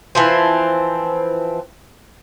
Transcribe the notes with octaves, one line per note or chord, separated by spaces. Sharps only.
E3 F3 C4